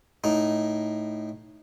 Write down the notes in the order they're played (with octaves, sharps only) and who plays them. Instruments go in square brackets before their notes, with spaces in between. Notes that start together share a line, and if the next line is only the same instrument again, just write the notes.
[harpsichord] A2 D#4